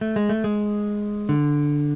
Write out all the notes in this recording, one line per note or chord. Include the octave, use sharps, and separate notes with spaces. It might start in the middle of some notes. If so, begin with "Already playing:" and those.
A3
G#3
A3
G#3
D3